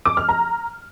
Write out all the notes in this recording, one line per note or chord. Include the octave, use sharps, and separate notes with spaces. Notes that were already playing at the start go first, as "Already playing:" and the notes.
D6
F6
A#5